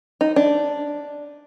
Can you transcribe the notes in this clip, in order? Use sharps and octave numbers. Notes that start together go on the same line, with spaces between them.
D#4
D4